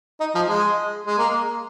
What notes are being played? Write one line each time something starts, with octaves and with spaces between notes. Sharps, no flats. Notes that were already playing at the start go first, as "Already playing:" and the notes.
D#4
F3
G#3
G#3
A#3